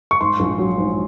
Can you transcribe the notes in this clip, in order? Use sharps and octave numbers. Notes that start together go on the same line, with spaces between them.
C#6
G#2 C6
A#1
F#3
G#2